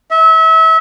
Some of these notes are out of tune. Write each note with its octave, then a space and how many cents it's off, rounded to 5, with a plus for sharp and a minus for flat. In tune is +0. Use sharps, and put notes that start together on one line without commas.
E5 -30